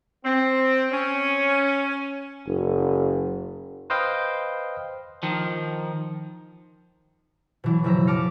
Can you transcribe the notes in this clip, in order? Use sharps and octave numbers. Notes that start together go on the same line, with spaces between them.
C4
C#4
F#1
B4 C5 D#5 F5 G5
D#3 F3
B2 E3 F#3
F#1 F3 E5 A#5 A#6
A5 D6 F6 A#6 C#7